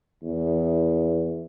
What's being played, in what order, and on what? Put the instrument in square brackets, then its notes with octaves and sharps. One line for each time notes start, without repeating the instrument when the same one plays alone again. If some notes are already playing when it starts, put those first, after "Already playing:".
[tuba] E2